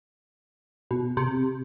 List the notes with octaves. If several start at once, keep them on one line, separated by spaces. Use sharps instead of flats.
B2
C3